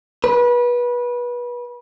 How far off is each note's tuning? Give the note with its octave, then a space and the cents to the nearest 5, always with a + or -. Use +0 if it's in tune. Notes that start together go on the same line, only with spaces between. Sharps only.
B4 -25